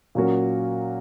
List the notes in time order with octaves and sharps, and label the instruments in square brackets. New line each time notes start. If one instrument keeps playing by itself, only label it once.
[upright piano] A#2 F#3 C#4 F#4 A#4